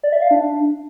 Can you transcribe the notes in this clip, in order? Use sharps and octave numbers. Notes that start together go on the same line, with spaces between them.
D5
E5
F5
D4